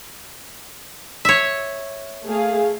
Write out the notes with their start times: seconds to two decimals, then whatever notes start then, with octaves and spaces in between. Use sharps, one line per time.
1.25 C#5 E5
2.27 A3 G#4 F5